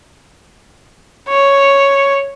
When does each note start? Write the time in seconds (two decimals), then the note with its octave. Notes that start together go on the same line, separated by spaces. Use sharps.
1.29 C#5